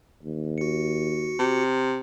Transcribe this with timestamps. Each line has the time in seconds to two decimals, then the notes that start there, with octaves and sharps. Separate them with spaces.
0.23 D#2
0.58 F#4 C#7
1.39 C3